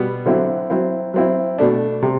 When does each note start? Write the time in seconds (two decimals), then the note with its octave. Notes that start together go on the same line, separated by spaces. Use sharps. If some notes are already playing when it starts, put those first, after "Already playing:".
Already playing: B2 G3 B3
0.26 D3 F#3 C4 E4
0.70 F#3 C4 E4
1.14 F#3 C4 E4
1.58 B2 A3 D4
2.02 C3